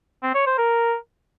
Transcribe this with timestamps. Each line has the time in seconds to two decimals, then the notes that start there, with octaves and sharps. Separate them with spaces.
0.23 C4
0.35 C#5
0.46 C5
0.58 A#4